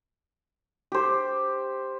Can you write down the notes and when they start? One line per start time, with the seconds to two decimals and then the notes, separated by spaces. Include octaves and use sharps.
0.92 G4 C5